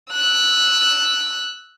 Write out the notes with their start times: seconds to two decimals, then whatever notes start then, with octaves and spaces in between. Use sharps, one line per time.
0.13 E6 F#6